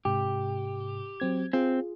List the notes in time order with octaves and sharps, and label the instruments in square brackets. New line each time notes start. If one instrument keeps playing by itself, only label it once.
[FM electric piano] G#2 C3 [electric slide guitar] G4
[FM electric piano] F#3 C4 G#6
[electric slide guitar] C4 [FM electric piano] F4 G#4